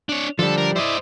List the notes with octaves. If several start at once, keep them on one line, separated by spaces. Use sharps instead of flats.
D4 C#5
D3 F3 G3 A4
A#4
E4 C5 D5 D#5